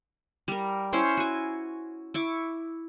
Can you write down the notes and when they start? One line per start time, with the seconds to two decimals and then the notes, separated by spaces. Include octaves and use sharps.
0.48 G3 A#4
0.93 C#4 E4 C5 C#5
1.17 F#4 G#5
2.14 E4 C#6 D6